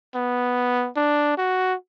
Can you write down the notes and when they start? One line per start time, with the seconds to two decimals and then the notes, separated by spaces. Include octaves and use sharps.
0.15 B3
0.96 D4
1.37 F#4